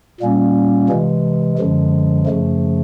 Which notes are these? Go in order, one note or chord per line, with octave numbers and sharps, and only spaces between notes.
A#2 G3 A#3 C#4
C3 E3 G#3
F#2 D3 F3 G#3
F#2 C#3 F3 A3